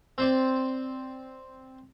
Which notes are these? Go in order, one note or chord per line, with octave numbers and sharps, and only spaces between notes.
C4 C5 D5